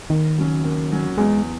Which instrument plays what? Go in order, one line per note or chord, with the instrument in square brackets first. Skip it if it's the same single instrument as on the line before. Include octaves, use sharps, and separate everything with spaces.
[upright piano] D#2 [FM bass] D#3
[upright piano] C#3 F#3 C#4
D#2
C#3 F#3 C#4
[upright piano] E2 [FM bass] G#3